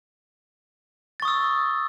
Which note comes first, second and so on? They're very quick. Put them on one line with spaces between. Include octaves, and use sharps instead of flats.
A6 C#6 D#6 E6